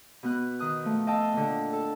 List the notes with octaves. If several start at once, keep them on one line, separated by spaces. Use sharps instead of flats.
B2 B3 F#6
D#3 D#6 F#6
F3 A3
D#5 F5 G5 A5 E6
A#2 D3
A4